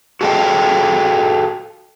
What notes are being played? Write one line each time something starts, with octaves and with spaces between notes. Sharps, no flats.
F#4 G#4 A4 D#5 F5 G5